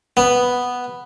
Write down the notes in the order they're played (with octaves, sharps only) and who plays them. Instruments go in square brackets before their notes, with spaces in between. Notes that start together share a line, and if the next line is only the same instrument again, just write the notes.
[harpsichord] B3